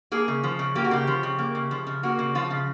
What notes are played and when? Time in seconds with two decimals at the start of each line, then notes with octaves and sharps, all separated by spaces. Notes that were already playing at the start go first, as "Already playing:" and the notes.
0.12 A#3 G#4
0.28 C#3
0.43 F3
0.59 C#3
0.75 A#3 G4
0.84 F#4
0.91 C#3 G4
1.07 F3
1.23 C#3
1.39 A#3
1.55 C#3
1.71 F3
1.87 C#3
2.03 A#3 F#4
2.19 C#3
2.35 F3 F4
2.50 C#3